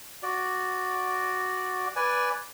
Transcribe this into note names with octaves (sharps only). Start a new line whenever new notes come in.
F#4 D5
B4 D5 G#5